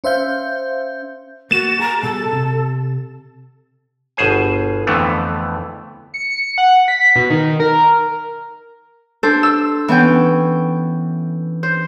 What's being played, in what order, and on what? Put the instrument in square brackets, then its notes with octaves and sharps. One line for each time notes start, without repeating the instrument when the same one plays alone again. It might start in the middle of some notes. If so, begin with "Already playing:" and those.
[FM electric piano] C#4 C5 E5 F5 G6
[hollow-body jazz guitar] A#3 [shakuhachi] F#4 [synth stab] A6 E7
[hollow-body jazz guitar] G#4 [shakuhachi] A#5
[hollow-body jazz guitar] B2 G3 G#4 [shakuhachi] A4
[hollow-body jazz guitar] C3
[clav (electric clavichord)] G1 B2 G#4 C5 G#5
F2 D3 E3 A3 B3
[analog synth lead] C#7
F#5
B6
B2
D#3
A#4
[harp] D4 A4 C5
E6
E3 B3 C#4 G5
C5